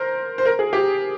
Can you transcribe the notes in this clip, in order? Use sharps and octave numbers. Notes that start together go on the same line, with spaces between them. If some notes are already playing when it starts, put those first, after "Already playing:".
Already playing: A#4 C5
C5
A#4
G#4
G4